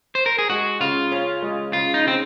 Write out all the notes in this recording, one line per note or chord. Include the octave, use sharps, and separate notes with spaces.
C5
A#4
G#4
G#3 F#4
C#3 F4
C#4
G#3
C#3 F4
D#4
C#3 C4